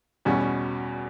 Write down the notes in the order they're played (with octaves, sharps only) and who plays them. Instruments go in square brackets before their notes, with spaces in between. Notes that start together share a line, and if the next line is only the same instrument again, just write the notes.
[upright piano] E2 B2 G3 C#4